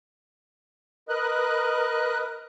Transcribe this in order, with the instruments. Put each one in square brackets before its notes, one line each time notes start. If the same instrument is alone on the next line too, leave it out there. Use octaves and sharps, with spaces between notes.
[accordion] A#4 B4 D#5 F#6